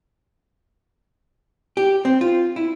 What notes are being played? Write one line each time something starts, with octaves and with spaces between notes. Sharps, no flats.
G4
C4
F4
E4